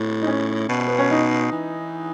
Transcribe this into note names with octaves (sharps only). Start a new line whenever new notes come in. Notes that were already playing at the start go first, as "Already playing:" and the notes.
Already playing: A2
D#4
C#4
B2
B3
C#4
D#4
E3